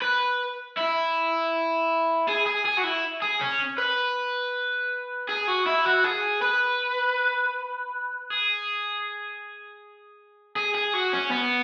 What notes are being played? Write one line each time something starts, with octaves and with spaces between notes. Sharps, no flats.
B4
E4
G#4
G#4
G#4
F#4
E4
G#4
C#4
B4
G#4
F#4
E4
F#4
G#4
B4
G#4
G#4
G#4
F#4
C#4
B3